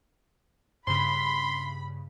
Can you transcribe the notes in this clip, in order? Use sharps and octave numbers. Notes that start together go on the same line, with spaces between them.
G2 C#3 B5 C6